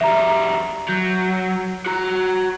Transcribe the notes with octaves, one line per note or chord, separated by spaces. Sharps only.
F2 G3 E5 A#5
F#3 G6
F#4 A#5